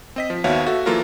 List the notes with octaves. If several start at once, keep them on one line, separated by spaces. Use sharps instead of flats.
C4 D#5 B6
F3
D#2 B3 F#4 C#5 E5 F5
F#4 A4 E5
E3 F#3 A#3 F4 A4 A#4